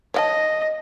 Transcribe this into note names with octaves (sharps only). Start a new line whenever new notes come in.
C#5 D#5 F#5 A5